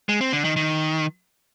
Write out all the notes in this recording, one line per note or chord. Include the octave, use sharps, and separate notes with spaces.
G#3
C4
D3
D#3
D#3